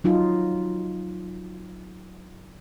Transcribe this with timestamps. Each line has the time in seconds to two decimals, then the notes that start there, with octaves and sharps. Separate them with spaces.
0.04 F#3 D#4 F4